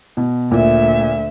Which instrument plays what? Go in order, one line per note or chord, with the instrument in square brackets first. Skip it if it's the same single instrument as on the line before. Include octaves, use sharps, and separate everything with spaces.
[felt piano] B2
[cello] D2 E5 [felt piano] A#2